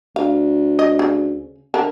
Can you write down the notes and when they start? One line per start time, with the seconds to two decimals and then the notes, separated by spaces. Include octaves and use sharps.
0.16 D2 F5
0.79 D#5
0.99 C#3
1.74 D3 A#4 A5